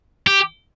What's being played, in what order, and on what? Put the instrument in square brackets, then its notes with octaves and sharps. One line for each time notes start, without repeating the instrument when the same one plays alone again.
[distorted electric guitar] G4